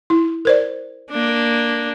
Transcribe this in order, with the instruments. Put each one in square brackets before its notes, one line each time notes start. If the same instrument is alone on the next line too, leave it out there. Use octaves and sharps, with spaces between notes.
[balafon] E4
A#4 C5 D5
[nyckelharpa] A#3 D4